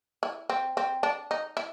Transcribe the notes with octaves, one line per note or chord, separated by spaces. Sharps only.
E4
C4
C4
D4
D#4
E4